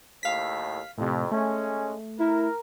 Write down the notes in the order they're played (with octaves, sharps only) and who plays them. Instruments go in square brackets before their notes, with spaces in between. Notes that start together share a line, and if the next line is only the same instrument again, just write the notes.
[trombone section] D#2 A2 [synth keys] F5 B6
[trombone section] F2 [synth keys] A2 C3
[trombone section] G#3 C#4 [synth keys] A3
[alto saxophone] E4 [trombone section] A#4